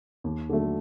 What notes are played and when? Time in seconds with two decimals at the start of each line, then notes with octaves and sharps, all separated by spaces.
0.24 D#2
0.49 D3 F#3 A3